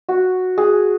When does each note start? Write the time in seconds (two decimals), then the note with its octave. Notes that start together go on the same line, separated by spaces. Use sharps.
0.09 F#4
0.58 G#4